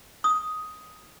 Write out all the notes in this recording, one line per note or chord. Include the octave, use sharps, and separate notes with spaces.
D#6